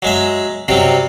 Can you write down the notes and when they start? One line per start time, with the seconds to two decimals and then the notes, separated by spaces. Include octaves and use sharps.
0.02 F#3 G#3 E5
0.68 C3 F#3 G3 C4